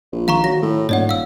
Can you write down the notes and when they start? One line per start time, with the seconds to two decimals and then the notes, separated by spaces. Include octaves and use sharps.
0.12 A#1
0.28 D#3 F5 A#5 C#6
0.44 F#3 A#6
0.62 A2
0.89 D#1 G#2 C#5 D5 F#5
1.09 F5 E6